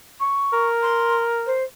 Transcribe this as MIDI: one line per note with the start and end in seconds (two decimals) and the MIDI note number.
0.20 0.67 85
0.53 1.54 70
0.83 1.25 84
1.46 1.64 72